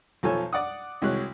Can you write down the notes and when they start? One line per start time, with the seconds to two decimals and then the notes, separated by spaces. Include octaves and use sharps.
0.23 B1 F3 A4 C#5 G#5
0.53 D5 F#5 D#6
1.02 C2 G#3 F#4 C#5 F#6